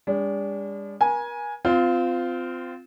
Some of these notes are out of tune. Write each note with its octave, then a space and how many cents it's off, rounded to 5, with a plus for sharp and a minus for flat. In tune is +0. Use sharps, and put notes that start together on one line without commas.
G#3 -45 D4 -30
A#4 +40 G#5 +0
C4 -25 F4 +0